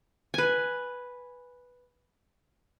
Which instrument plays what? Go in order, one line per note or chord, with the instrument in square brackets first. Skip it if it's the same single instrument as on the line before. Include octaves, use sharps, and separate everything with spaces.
[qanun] B4 G#5